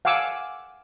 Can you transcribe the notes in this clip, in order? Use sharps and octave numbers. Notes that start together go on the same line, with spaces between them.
F5 F#5 G#5 D6 E6